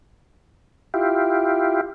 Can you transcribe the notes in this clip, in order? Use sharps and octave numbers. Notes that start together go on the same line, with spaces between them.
E4 F4 G4